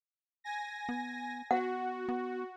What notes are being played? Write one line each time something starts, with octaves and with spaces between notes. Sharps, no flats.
G#5 A#6
B3
B3 F#4 F#5
B3